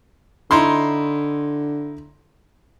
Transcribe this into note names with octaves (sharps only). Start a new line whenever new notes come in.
D3 D#4 E4 C6